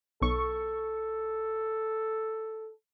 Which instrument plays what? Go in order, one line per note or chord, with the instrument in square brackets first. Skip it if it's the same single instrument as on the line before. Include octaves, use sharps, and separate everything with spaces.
[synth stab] B1 C#6 [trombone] A4